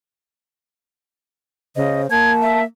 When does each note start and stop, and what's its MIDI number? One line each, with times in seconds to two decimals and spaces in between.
1.76 2.06 49
1.76 2.08 72
1.76 2.02 75
2.10 2.64 58
2.10 2.59 81
2.10 2.32 92
2.42 2.63 76